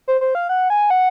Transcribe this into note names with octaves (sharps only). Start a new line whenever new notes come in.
C5
C5
F5
F#5
G#5
F#5